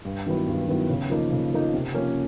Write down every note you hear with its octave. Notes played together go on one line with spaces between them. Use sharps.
G2
D#3 F#3 B3 E4
G2
D#3 F#3 B3 E4
C#3
F3 A#3 D#4
C#3
F3 A#3 D#4
C3
F3 A#3 C#4